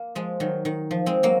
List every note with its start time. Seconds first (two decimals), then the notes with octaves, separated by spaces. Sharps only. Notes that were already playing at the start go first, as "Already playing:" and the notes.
Already playing: A#3
0.15 F3 G#3
0.40 D#3 F#3
0.65 D#3
0.91 F3
1.06 G#3 C4
1.23 F#3 A#3